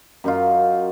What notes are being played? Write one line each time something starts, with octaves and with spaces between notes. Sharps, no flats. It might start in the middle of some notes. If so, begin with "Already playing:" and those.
F#2 D#4 F4